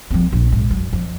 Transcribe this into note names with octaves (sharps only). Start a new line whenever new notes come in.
F3 C4
A#1
G#2
F#2
F2